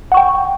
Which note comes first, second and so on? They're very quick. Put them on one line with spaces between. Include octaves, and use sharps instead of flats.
F#5 C#6 G5